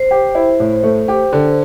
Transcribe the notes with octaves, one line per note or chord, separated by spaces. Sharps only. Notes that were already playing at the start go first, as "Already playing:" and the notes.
Already playing: C5
G4
E4
A2
A3
G4
D3